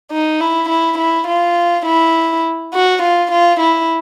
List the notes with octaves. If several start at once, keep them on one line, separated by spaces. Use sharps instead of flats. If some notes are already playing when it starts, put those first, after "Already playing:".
D#4
E4
E4
E4
F4
E4
F#4
F4
F4
E4